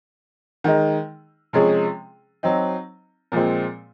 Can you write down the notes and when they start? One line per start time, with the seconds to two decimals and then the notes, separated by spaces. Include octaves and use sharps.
0.64 D#3 G#3 D#4
1.53 C3 F3 G#3 C#4 G#4
2.43 F#3 C4 D#4
3.32 A#2 F3 G#3 C4